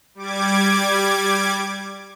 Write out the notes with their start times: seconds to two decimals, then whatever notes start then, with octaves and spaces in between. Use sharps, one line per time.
0.15 G3 D6 G#6